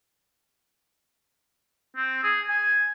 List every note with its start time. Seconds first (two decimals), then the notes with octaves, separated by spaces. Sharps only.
1.96 C4
2.23 G#4
2.49 G#5